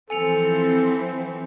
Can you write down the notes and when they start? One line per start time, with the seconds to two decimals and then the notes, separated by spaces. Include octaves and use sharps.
0.10 E3 F3 C4 A4 G#5 C#7 F7